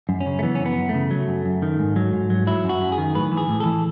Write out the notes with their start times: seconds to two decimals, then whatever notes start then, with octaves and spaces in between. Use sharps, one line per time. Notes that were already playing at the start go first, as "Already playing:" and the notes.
0.09 F#2
0.21 C#4
0.26 C#3
0.39 A3
0.43 E3 B3
0.55 C#4
0.60 F#2
0.66 B3
0.77 F#2
0.89 A3
0.94 C#3
1.11 F#3
1.28 F#2
1.45 F#2
1.62 D#3
1.79 G#2
1.96 F#3
2.13 G#2
2.30 F#3
2.47 F#3 E4
2.64 F#2
2.69 F#4
2.81 F#2
2.92 G#4
2.98 D#3
3.15 A2 B4
3.32 E3
3.37 G#4
3.49 A2
3.60 A4
3.65 E3